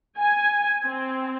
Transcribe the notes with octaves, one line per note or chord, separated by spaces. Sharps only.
G#5
C4